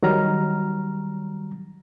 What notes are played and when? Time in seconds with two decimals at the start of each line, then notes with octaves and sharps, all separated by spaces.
0.03 D#3 F#3 G3 A#5 F6